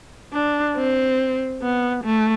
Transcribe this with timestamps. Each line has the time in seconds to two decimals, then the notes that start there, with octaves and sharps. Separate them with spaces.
0.33 D4
0.76 C4
1.62 B3
2.04 A3